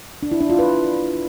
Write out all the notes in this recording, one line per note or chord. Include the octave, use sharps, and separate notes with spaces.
D4
E4
D4
F4
B4